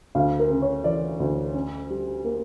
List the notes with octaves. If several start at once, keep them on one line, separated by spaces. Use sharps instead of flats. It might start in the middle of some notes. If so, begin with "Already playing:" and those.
D2 F5
A#4
C#3
C#5
E3 D5
D2
C#4
G3
A#3